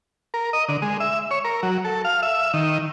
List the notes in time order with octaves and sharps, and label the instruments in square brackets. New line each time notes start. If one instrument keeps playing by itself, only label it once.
[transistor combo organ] A#4
D#5
D3
G#3
E5
C#5
A#4
F#3
A4
F5
E5
D#3